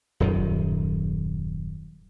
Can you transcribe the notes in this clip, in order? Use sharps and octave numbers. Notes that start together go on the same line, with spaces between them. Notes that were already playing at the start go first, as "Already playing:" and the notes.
D#1 F#2 D#3